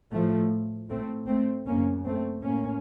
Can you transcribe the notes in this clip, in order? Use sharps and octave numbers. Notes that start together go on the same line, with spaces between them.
A2 F3 A3
A2 A3 C4
A3 C4
F#2 C#3 A#3 C#4
A3 C4
A2 A#3 C#4